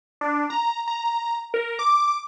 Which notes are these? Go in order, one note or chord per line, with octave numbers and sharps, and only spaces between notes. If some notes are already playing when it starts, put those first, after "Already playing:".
D4
A#5
A#5
A#4
D6